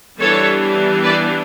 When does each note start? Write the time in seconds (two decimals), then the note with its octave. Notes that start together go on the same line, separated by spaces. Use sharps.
0.19 E3 G3 B3 D4 A4 C#5
1.03 B4 D5